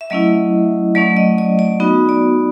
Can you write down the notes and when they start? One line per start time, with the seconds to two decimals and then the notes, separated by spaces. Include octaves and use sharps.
0.01 E5
0.10 F#3 A3 C#4 E4 D#5
0.95 F#3 A3 C#4 D5
1.17 D#5
1.38 D5
1.59 D5
1.80 B3 D#4 F#4
2.09 D5